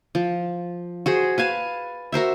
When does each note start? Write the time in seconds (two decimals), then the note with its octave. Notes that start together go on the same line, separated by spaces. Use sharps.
0.15 F3
1.06 F#4 G#4 C5
1.38 B4 F5 G#5 A5
2.12 F#4 A#4 C5 E5